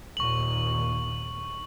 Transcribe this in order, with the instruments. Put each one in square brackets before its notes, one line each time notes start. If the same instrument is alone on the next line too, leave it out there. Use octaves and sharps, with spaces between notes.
[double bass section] D#2 A#2 [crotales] C#6 F#7